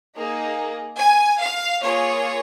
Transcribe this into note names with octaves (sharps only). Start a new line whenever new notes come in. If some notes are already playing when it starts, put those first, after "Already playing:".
A#3 D#4 G#4
G#5
F5
A#3 F4 G#4 C#5